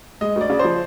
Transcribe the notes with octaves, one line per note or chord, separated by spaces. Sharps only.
G#3 D#5
D2
D5
C#3
F3 C5